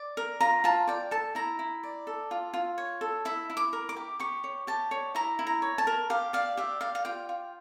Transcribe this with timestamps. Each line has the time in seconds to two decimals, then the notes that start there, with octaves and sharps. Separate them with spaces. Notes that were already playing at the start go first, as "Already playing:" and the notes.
Already playing: D5
0.17 A#4
0.40 F4 A#5
0.64 F4 A5
0.87 D5 G5
1.11 A4 A5
1.35 E4 A#5
1.59 E4
1.83 D5
2.07 A4
2.31 F4
2.54 F4
2.78 C#5
3.01 A4
3.25 E4 E5
3.50 E4
3.57 D6
3.73 A#4
3.89 D6
3.97 G4
4.20 G4 C#6
4.44 C#5
4.67 G4 A5
4.91 C#5
5.15 E4 A#5
5.39 E4
5.47 A#5
5.62 C#5
5.78 A5
5.87 A#4
6.10 G4 F5
6.33 D5 F5
6.57 G4 E5
6.81 D5 F5
6.95 F5
7.05 F4 G5
7.29 F4